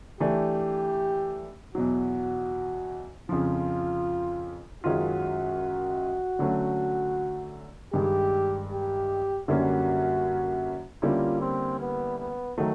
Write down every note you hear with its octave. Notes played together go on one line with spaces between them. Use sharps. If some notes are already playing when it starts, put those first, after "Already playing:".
E3 A3 D4 G4
E2 B2 F#3 F#4
F2 C#3 F3 F4
F#2 D#3 G#3 C#4 F4 F#4
D3 F#3 A3 C#4
G2 D#3 G#3 G4
G4
F#2 D3 G3 A#3 C#4 F#4
D3 G3 A#3 C#4 E4 F4
C4
B3
B3
D#3 F#3 A3